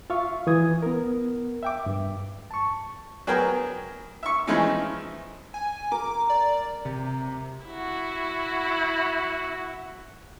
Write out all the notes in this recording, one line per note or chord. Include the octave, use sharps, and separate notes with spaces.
F4 E5 F5 C#6
E3 E4 D#6 G#6
B3 A#4
E5 G5 D6
G2
A5 C#6
F#3 B3 G#4 A#4 G5
E5 C#6
E3 F3 G#3 A3 C#4 D#4
G#5
A#4 D6
D5
C3
E4 F#4